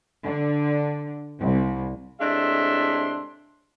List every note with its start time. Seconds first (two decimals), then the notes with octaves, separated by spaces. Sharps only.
0.24 D3
1.41 C2
2.21 A2 C3 G#3 D4 E5 C6